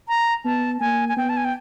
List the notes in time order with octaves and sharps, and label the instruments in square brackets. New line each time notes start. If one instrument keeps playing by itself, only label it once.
[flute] A#5
[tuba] B3 [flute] A5
[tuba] A#3 [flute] G#5
[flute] G#5
[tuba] B3 [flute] G5
[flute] A5
G#5
G5